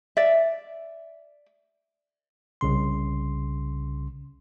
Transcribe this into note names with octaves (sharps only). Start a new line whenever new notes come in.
D5 E5
C2 C#3 C6